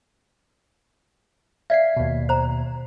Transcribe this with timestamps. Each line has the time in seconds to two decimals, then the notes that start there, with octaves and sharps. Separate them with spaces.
1.70 D5 E5 F5 B6 C7
1.97 D#2 B2
2.29 C5 A#5